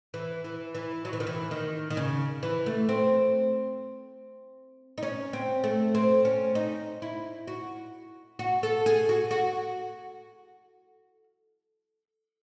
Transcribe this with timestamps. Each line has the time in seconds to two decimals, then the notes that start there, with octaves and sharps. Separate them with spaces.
0.14 E3
0.44 E3
0.75 E3
1.05 F#3
1.13 E3
1.20 D#3
1.27 E3
1.51 D#3
1.90 D#3
1.97 C#3
2.43 E3
2.66 A3
2.89 C4
4.98 D#4
5.03 C#4
5.33 C4
5.64 A3
5.95 C4
6.25 C#4
6.55 D#4
7.02 E4
7.47 F#4
8.39 F#4
8.63 A4
8.86 G#4
9.09 F#4
9.31 F#4